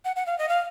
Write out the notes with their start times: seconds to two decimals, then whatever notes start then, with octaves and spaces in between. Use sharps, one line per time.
0.05 F#5
0.16 F#5
0.26 F5
0.39 D#5
0.49 F5